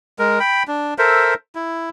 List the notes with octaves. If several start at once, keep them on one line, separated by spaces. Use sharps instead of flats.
G#3 A#4
G5 B5
D4
A4 A#4 C5 E5
E4